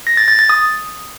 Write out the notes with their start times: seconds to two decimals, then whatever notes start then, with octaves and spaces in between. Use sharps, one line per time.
0.07 A#6
0.17 A6
0.28 A6
0.39 A6
0.49 D#6